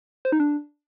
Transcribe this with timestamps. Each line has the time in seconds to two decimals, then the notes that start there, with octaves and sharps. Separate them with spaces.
0.25 C5
0.32 D#4
0.40 D4